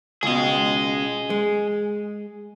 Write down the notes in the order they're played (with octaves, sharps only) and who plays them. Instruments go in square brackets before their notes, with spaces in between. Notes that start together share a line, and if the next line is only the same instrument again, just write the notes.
[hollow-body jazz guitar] C#2 B2 [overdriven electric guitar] G#4 D#5
[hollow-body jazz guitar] G#3